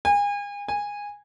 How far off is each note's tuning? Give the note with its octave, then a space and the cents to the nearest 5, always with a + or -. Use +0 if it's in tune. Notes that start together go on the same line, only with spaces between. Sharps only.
G#5 -35
G#5 -15